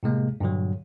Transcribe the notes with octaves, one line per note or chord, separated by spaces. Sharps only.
A2 C3 G#3 A#3
G2 A#2 D3 F#3